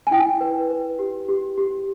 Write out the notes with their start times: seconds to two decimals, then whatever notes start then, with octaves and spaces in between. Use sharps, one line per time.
0.07 G#5
0.11 E4 G5
0.41 B4
0.70 B4
0.99 G4
1.29 G4
1.58 G4